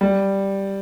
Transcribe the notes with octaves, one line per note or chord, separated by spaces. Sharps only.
G3